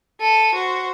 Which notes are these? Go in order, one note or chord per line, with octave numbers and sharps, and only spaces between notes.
A4 D#7
F#4 C5